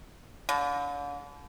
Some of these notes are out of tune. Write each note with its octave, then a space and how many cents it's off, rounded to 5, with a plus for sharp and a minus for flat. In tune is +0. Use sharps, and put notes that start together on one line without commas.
D3 -40